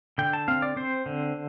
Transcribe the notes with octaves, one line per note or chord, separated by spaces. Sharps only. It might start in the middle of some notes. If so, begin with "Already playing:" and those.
D3 G5
A5
C4 F5
D5
C4 C5
D3